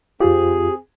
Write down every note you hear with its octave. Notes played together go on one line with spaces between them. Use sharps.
F2 C4 F4 G4 G#4